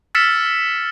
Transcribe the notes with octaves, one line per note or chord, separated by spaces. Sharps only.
E6 F6 A6 B6 C#7 E7